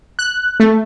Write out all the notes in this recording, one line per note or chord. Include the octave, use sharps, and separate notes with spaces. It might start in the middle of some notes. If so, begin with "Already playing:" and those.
F#6
A3